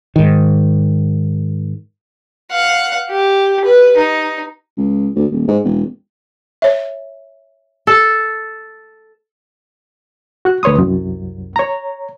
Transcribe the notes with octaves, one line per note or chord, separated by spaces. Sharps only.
G#2 D#3
F5 F#5
G4
B4
D#4
C#2
D2
D#1
G#2
E1
C#5 E5
A4
F#4 F#6
D2 B4 C#5 C6 D#6
C2 F#2
C#5 A#5